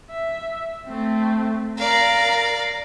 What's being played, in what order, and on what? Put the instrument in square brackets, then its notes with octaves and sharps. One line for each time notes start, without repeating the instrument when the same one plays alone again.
[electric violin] E5
A3 C4
[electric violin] A#4 A#5 [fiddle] D5 F5